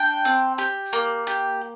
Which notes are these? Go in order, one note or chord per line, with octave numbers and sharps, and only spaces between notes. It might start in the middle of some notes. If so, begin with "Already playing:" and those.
Already playing: D4 G5
C4
G4
A#3
G4